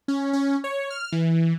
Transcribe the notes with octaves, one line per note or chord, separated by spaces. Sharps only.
C#4
C#4
C#5
F6
E3